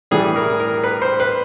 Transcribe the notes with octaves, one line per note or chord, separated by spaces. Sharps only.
A2 E3 G3 G#4
A#4
A#4
B4
C5
B4